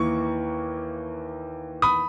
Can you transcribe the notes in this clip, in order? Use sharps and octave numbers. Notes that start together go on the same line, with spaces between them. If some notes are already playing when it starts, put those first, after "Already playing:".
Already playing: D#2 E3 A#3 C#6
B5 D#6